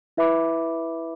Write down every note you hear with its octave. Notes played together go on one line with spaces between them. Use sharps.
E4 B4 E5 B5 D6